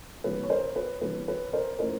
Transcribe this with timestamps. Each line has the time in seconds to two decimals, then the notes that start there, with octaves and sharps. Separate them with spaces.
0.24 C3 E3 G3 A#3 D4 B4
0.43 C#5
0.50 A#4 C5
0.76 B4
1.01 C3 E3 G3 A#3 D4 B4
1.28 B4
1.53 A#4 C5
1.79 F3 A3 C#4 E4 A#4 C5